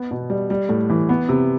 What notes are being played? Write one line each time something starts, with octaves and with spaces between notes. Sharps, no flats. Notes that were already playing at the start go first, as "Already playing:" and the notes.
Already playing: B3
B2
G3
G3
A2
E3
B3
C3